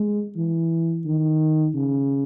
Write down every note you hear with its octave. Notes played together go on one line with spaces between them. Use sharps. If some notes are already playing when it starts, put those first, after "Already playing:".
Already playing: G#3
E3
D#3
C#3